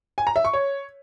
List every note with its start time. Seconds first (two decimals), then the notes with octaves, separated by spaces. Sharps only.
0.18 G#5
0.27 A#5
0.36 E5
0.45 C#6
0.53 C#5